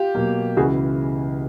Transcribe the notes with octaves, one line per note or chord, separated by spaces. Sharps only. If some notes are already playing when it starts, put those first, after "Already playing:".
Already playing: F4 G4
B2 F#3 A#3
C#2 C#3 E3 F#4 G#4